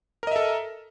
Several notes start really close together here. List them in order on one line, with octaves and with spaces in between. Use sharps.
A#4 D#5 E5 A4